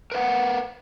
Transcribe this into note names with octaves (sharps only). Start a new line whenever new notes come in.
A#4 B4 F5 F#5